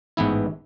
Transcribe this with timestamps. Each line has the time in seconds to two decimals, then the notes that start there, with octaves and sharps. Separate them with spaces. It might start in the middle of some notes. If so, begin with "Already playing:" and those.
0.17 A1 G#2 E3 B3 E4